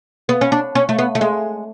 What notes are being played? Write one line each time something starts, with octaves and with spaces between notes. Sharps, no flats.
B3
C#4
D4
C#4
A3
B3
A3
G#3